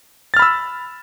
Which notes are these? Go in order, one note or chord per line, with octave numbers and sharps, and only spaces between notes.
B5 E6 F6 A6